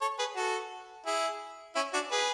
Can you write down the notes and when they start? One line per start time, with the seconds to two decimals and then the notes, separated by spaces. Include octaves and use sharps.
0.01 A4 C#5
0.19 G#4 B4
0.36 F#4 A4
1.06 E4 G#4
1.75 C#4 E4
1.93 D4 F#4
2.11 G#4 B4